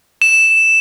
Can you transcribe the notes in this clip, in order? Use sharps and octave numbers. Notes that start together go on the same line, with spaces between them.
E7